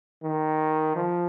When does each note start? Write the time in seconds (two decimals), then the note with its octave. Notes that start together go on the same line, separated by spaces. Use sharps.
0.23 D#3
0.96 F3